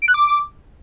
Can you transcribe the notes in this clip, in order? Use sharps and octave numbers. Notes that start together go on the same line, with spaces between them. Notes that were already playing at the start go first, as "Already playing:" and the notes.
D7
F#6
D6